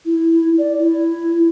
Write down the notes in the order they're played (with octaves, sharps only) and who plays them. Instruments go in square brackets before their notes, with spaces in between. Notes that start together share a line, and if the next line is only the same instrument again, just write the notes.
[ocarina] E4
D5
E4